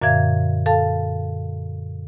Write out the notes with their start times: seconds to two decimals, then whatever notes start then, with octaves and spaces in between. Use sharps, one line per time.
0.02 F#2 A#2 D3 E5 F5 G#6
0.66 A4 F5 A5